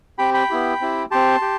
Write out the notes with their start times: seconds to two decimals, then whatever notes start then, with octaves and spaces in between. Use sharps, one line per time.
0.18 C4 G4 G5 B5
0.34 G5 B5
0.50 B3 E4 G4
0.81 C4 E4 G4
1.11 C4 G4 A5 C6
1.42 G4